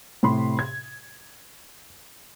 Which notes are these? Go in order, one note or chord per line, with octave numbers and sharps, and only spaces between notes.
A2 C3 B5 C6
G#6